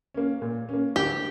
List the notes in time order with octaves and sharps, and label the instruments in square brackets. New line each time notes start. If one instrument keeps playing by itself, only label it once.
[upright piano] A#3 C#4
A#2
A#3 C#4
[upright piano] D2 [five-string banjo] G4